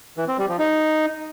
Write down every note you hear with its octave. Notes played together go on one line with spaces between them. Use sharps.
E3
C4
G3
F3
D#4